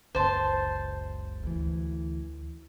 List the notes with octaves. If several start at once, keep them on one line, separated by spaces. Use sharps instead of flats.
F#1 C#2 C5 A5
D2 E3